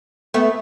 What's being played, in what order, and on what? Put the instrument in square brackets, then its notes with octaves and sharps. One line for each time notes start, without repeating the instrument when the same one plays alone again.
[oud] A3 B3